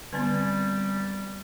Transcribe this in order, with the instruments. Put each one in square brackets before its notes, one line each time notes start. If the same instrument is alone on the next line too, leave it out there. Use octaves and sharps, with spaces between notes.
[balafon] D3 B3 C4 [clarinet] G3